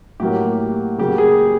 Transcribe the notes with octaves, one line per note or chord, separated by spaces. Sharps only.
A2 F#3 A#3 G4
C#3 F#3 A#3 G4
G#4